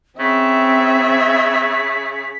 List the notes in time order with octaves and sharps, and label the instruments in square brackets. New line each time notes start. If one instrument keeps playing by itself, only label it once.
[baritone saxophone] C#3 [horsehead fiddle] C4 [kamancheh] E5 [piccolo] B6